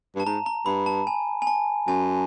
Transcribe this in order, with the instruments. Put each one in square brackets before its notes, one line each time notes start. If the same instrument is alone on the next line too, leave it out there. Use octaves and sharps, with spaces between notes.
[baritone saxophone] G2 [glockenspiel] A5
[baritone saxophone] G#2 [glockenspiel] A#5
[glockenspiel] A#5
[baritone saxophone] G2 [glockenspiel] B5
[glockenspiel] A5
G#5
G#5
A5
[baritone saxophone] F#2 [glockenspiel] G#5